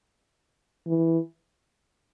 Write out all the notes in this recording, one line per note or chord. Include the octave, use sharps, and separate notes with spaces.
E3